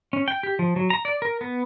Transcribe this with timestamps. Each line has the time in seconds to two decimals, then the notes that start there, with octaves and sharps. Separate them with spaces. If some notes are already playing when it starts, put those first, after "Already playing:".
0.13 C#4
0.28 G5
0.43 G4
0.59 F3
0.76 F#3
0.90 A#5
1.05 D5
1.22 A#4
1.41 B3